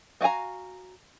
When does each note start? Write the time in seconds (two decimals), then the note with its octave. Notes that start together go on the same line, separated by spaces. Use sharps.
0.21 B3 F#4 F5 G#5 A#5